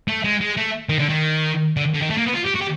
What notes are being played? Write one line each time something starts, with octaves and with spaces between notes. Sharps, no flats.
A3
G#3
G#3
A3
D#3
D3
D#3
D3
D3
D#3
A3
A#3
B3
F4
G4
F#4
G4